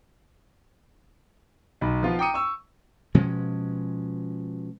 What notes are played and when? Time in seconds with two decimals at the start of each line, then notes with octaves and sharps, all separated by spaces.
1.81 B1 B5
2.03 F3 B3 F4
2.19 G5 A#5 D6 D#6 C#7 D#7
2.34 C#6 E6
3.14 B2 F3 G#3 C#4